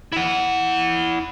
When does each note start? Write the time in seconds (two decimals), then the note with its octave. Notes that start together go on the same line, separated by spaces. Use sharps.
0.13 E4 F#5